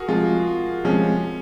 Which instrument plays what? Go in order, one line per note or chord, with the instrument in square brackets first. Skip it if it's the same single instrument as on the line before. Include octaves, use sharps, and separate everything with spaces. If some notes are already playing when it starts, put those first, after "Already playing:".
Already playing: [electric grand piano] F#4 G#4 A#4
[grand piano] C3 F3 G#3 [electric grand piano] F4
[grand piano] C3 F3 G#3 [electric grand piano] C#4